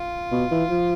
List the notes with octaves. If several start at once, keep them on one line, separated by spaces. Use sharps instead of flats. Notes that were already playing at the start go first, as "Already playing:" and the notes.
Already playing: F4
B2
E3
F3